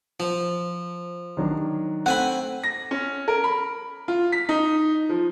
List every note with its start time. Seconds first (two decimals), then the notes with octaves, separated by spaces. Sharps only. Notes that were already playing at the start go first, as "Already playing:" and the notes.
0.20 F3
1.37 D#3 F#3 D4
2.06 A3 C4 F#5 G#5 B5
2.64 A#6
2.91 C#4
3.28 A#4
3.44 B5
4.08 F4
4.32 B6
4.49 D#4
5.09 F3